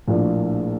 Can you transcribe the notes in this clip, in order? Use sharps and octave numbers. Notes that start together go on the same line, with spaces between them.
A#1 A2 F3 A#3 D4